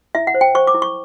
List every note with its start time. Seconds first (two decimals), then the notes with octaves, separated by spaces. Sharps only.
0.15 E4 E5
0.27 F#5
0.34 C5
0.41 G5
0.55 C5 C#6
0.67 D6
0.74 E4
0.82 C#6